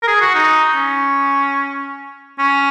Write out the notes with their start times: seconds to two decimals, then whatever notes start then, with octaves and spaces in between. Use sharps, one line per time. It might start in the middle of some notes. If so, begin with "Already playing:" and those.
0.03 A#4
0.07 G#4
0.21 F#4
0.34 D#4
0.75 C#4
2.39 C#4